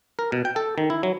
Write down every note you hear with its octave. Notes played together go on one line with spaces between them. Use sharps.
A#4
B2
G5
A4
D#3
E4
F#3